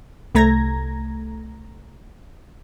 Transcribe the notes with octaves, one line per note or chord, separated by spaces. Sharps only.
C2 A3 A#5 G#6 A#6